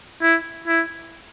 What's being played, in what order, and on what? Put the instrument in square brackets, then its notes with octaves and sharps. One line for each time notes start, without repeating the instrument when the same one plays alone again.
[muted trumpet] E4
E4